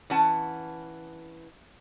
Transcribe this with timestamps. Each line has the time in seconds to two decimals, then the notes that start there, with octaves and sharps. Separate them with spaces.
0.10 E3 C#4 F#5 A5